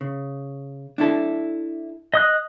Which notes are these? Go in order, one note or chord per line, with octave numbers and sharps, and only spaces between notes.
C#3
D4 E4 A4
D#5 D#6 F#6